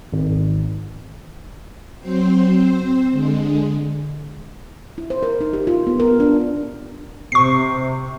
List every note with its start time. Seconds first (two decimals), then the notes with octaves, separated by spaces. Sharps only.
0.13 G#1
1.99 F#3 C4 C5
2.53 C4 C5
3.12 D3 G#3
4.98 E4
5.10 C5
5.23 A#4
5.41 D#4
5.53 G4
5.67 F4
5.87 B3
6.00 A#4
6.20 D4
7.32 C3 C#6 C7